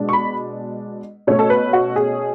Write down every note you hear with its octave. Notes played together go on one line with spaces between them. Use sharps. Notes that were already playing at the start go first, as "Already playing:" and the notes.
Already playing: B2 G#3 D4
C#6
B5
B2 A3 C#4 C#5
A4
B4
F#4
G#4